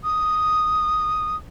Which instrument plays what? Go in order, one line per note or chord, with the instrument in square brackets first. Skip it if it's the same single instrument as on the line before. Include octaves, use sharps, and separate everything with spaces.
[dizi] D#6